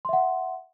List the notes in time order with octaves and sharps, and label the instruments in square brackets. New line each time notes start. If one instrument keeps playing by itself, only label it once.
[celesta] C6
E5
F#5